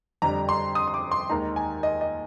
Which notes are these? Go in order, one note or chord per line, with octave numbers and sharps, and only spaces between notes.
F2 D3 G3 D4 A#5
C6
D#6
C6
D6
C6
D#2 D#3 G#3 D#4 A#5
G#5
D#5
D#5